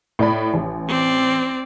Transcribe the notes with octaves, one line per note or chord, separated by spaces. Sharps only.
A2 D5 B5
A1
C4 D5